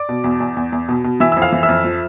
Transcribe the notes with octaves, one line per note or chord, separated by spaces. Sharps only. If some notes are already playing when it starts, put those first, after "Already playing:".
Already playing: D5 D6
B2
E2
E2
E2
E2
B2
B2
E3 E5 E6
E6
F2
F5 F6
E3
E5 E6
F2
F3